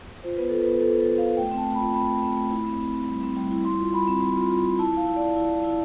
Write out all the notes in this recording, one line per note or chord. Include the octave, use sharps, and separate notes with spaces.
F4 C5
B3 B4
F4 A4
B3 B4
F4 A4
B3 A4
F4
F5
F4
A3 G5
C4
A5
A3
B5
F4
C4 B5
A3
C4
A3
E4
C4
C4
C4
G3
C4
G3
E4
G3 C6
F4
G3 B5
C4
G3
F4
F4
F4
E4 A5
E4 F5
E4
D5
E4
E4
E4
E4